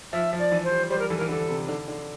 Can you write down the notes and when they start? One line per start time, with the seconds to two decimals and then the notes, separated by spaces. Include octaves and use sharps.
0.13 F3 E5
0.33 F3
0.39 D5
0.52 E3
0.64 C5
0.71 G3
0.90 G3 C5
0.99 A#4
1.09 E3 A4
1.17 A#4
1.21 E3
1.29 D3 A4
1.49 C3
1.68 D3
1.88 D3